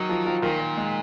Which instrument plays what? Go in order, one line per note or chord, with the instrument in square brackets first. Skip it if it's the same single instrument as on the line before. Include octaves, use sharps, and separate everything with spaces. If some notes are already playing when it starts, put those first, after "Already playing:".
Already playing: [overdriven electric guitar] D#3 [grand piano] F#3
[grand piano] F3
F3
[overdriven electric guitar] A#2 [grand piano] D#3
[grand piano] D#3
G#3